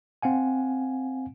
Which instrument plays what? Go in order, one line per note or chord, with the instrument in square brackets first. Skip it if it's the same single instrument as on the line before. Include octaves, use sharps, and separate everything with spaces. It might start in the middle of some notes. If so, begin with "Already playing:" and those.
[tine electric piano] C4 F5 F#5 G#5